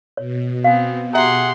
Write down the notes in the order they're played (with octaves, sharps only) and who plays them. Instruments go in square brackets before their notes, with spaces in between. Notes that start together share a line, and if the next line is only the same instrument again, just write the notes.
[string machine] B2 [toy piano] C#5
[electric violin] B3 C4 [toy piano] F5 G#5
[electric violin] G4 C6 [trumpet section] G#4 F#5 [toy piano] E5 A#5